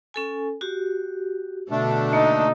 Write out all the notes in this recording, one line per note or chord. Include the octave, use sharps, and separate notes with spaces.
C#4 A4 G#5
F#4 G4
B2 D3 A3 D4 A4
A#3 D#4